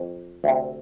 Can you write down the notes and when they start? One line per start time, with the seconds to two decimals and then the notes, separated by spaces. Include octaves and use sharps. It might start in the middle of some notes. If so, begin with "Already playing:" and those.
Already playing: F2
0.44 D2 C3